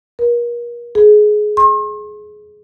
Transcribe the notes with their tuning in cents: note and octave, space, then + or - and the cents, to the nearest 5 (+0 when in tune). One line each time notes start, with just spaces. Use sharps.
A#4 +35
G#4 +20
C6 +45